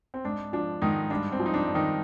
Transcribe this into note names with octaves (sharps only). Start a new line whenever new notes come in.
C4
G#2 D4
F3 D4
G#2 D#3 D#4
G2 D4
C4
F3
D#4
D4
G2
D#3 D#4